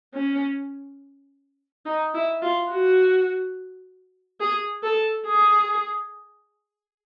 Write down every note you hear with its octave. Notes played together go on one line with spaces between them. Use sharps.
C#4
D#4
E4
F4
F#4
G#4
A4
G#4